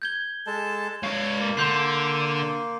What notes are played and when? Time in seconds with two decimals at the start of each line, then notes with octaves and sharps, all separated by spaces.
0.02 G6 G#6 G7
0.47 G#3 A4 A5
1.03 G#2 C#5 F5
1.40 A#3
1.57 D3 C6 G6 C7